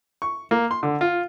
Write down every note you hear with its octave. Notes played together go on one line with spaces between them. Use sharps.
C#6
A#3
C6
D3
F4